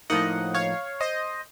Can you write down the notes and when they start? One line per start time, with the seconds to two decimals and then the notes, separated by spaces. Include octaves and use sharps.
0.10 A2 F3 A#3 D#4 D#5 F#5
0.54 C#5 F5
1.01 C5 D#5